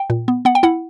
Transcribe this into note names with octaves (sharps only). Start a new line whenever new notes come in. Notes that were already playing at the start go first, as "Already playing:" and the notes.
Already playing: G5
A#2
B3
B3 F#5
G5
E4 F#5